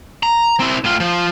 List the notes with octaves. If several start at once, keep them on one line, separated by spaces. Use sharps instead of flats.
A#5
C4 E4
A2 F4
F3